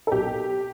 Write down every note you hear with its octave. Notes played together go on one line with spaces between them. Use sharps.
A4
B1 G4